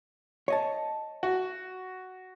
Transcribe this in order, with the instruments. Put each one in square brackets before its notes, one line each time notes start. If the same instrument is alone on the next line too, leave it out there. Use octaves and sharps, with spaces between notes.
[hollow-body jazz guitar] C#5 D#5 A5
[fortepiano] F#4